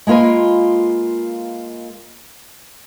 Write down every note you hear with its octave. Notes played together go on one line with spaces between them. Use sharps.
G#3 A#3 F4 B4 G#5